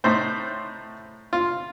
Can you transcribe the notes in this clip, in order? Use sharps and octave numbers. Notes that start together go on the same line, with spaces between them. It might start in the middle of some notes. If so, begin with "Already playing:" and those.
A2 A3 D#4 C5
F4